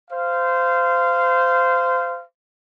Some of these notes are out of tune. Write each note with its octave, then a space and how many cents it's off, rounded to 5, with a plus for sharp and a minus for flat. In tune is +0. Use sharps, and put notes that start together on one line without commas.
C5 -20 F5 -15